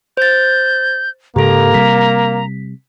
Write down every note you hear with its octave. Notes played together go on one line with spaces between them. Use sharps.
C5 G6 A6
G#2 C#3 A#3 G4 A4 A#5
C3 G3 B6